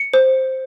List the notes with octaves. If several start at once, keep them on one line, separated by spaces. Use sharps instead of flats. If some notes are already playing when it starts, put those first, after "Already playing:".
Already playing: C#7
C5